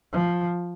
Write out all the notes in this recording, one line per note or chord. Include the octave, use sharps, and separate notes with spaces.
F3